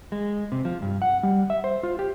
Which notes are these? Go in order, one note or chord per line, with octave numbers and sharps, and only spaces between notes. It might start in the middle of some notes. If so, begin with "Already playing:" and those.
G#3
C3
F3
G2
F#5
G3
E5
C5
F4
G4